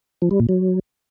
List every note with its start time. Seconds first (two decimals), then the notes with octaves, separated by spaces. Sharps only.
0.22 F3
0.31 G3
0.40 A#2
0.49 F#3